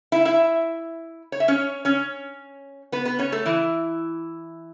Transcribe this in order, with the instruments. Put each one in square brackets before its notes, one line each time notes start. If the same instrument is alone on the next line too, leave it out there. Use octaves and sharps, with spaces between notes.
[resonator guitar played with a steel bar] E4 E5
E4 E5
C#5
E5
C#4 C#5
C#4 C#5
B3 B4
B3 B4
C#4 C#5
A3 A4
E3 E4